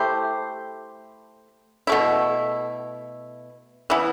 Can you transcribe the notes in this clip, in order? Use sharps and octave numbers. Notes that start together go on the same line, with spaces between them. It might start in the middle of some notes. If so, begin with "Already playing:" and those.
Already playing: A3 E4 G4 C5
B2 A3 E4
E3 B3 E4